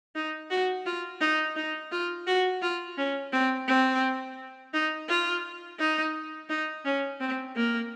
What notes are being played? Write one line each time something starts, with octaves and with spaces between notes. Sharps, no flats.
D#4
F#4
F4
D#4
D#4
F4
F#4
F4
C#4
C4
C4
D#4
F4
D#4
D#4
C#4
C4
A#3